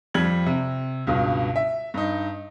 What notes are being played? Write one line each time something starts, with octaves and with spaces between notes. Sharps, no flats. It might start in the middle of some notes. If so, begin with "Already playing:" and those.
F2 G3 G#6 F#7
C3
C#2 G2 B2
E5
G2 D#4